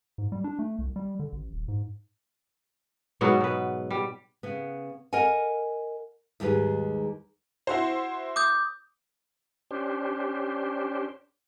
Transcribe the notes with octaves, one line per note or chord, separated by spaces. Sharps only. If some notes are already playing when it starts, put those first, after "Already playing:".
G#2
G3
D4
A3
C2
G3
D3
A1
D#1
G#2
G#2 B2 F#3 B3
B2 B4
G3
C#3 B3
A#4 D#5 F#5 G#5
D#2 G#2 G3 G#4 B4
E4 F#4 C5
D6 D#6 G6
C#4 D4 G4 C5